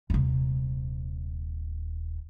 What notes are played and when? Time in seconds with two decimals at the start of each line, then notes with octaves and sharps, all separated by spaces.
0.10 D#1 C3